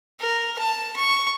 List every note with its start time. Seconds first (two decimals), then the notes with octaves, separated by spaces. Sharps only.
0.19 A#4
0.58 A5
0.96 C#6